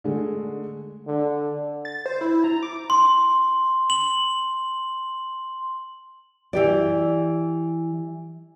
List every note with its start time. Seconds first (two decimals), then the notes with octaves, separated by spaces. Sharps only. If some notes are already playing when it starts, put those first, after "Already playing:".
0.04 D3 G#3 A3
1.07 D3
1.85 A6
2.06 C5
2.21 E4
2.44 A#5
2.63 D6
2.90 C6
3.90 F#7
6.53 E3 G4 D5